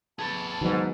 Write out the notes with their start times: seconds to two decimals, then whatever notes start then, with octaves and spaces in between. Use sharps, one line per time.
0.19 G#4 B4 A5
0.61 G#2 D#3 F#3 B3